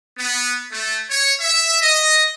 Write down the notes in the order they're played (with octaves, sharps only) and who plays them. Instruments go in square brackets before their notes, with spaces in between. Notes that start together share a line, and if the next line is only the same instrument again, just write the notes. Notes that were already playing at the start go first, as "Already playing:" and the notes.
[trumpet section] B3
A3
C#5
E5
D#5